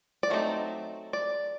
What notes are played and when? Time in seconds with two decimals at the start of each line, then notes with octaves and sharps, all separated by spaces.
0.23 D5
0.30 F#3 A3 C4 D#4
1.13 D5